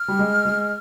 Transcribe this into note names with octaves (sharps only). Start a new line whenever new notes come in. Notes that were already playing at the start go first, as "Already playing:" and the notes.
Already playing: F6
G3
G#3
G#3